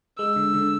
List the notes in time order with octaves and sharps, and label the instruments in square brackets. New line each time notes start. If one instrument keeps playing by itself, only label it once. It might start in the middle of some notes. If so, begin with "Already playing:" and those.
[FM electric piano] G#3 [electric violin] E6
[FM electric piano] D3
D3